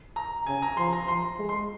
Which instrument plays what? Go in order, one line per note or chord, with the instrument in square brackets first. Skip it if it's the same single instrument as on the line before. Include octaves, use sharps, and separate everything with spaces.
[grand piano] A#5
[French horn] C#3 [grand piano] G#5
[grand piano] A#5
[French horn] F3 [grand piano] C6
[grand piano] A#5
[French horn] F3 [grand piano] C6
[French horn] G#3
[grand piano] C6